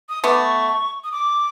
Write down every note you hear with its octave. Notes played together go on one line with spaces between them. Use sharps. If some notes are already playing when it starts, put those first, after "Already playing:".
D#6
A3 B3 D6
C#6
D#6
D6